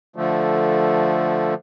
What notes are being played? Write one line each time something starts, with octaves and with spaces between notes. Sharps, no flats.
D3 F3 A3